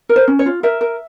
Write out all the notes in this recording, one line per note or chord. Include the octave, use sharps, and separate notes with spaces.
A#4
C5
C#4
C#5
F4
A#4 E5
A#4